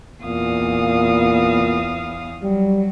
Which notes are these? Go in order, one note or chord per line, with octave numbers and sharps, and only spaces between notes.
E2 A#2 F5 D#6
F#3 G3